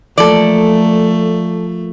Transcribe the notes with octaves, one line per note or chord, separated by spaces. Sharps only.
F3 A3 A#3 A4 D5